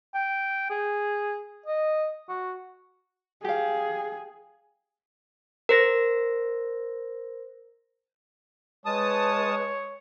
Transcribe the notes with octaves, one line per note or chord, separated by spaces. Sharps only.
G5
G#4
D#5
F#4
G4 G#4 F5
A#4 C5 A#6
G#3 B4 C#5 A5 D#6